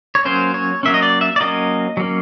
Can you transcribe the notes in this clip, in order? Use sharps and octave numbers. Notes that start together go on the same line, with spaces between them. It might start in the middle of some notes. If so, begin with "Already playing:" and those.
C#5
F#3 A#3 C#4 C5
C#5
F#3 A#3 C#4 E5
D#5
D5
E5
D5
F#3 A#3 C#4 D#5
F#3 A#3 C#4